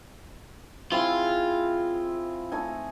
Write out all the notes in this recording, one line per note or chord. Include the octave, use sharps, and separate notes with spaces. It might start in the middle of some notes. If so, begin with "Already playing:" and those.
C4 E4 F4 G#4
A3 D#4 G#5